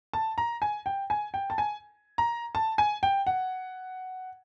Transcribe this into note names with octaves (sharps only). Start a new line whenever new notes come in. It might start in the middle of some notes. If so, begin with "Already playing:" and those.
A5
A#5
G#5
G5
G#5
G5
A5
G#5
A#5
A5
G#5
G5
F#5